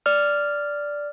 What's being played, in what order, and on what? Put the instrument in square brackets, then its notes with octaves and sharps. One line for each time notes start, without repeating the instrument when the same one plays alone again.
[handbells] D5 F6